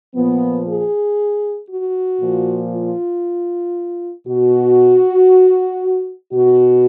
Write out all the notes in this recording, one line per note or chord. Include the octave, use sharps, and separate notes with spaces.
A#2 F3 B3
G#4
F#4
A#2 F3
F4
B2 F#4
B2 F#4